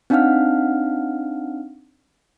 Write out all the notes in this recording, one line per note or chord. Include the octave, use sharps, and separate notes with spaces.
C4 D4 D#4 F5 F#5 F6